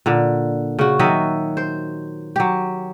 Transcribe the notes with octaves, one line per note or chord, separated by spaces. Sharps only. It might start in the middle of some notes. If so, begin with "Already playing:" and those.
A#2 D3
C#3 F#4
D#3 F#3 D#5 E5
C5
F#3 G4